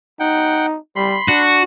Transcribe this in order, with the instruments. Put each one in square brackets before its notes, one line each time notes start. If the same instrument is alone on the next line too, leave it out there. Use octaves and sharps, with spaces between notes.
[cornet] D#4 [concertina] F#5 G5
[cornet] G3 [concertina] B5 C6
[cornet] D4 [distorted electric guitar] F#4